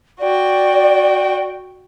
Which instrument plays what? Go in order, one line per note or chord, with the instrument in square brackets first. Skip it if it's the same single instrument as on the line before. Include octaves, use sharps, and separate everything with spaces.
[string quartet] F#4 G5 [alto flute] D5